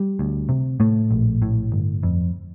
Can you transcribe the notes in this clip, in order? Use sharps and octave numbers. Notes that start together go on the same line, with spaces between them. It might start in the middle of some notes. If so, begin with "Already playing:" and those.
Already playing: G3
D2
C3
A2 A3
A#1
A2
G1
F2